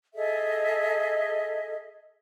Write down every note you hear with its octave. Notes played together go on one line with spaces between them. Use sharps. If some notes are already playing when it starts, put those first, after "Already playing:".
G#4 A4 D#5 E5